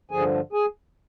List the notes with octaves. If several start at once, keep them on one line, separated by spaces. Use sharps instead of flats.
G2 D3 F3 G#4 G#5
G#4 G#5